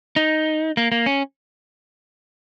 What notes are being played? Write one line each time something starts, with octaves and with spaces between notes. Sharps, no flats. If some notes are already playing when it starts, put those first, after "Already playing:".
D#4
A#3
A#3
C#4